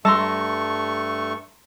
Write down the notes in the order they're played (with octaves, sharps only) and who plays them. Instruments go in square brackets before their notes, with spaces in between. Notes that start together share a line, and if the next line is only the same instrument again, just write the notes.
[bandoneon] G2 A3 C#6 [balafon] G3 [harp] A5 A#5 C6